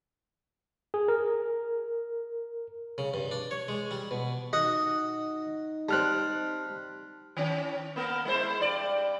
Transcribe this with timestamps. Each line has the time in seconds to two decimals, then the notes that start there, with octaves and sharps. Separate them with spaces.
0.94 G#4
1.08 A#4
2.98 C#3
3.14 G2
3.31 D4
3.51 C#5
3.68 G#3
3.91 G3
4.11 B2
4.53 D#4 F#4 D#5 F#5
5.89 G3 C4 A5 F6 F#6
7.37 D#3 C#4
7.96 A#3 B3 A#4
8.25 G#3 E4 C5
8.60 G2 D5